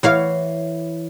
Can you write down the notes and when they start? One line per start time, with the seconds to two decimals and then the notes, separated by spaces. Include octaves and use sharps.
0.03 E3 C#5 F5